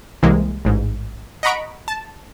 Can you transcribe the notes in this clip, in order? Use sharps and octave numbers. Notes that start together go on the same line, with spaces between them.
C2 C3 E3 G#3 A#3
A1 G#2
D#5 F#5 A#5 B5 C#6 D7
A5